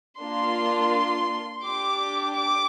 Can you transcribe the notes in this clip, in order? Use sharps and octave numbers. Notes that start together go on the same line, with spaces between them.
A#3 D4 F4 C6
D4 G4 D6
D6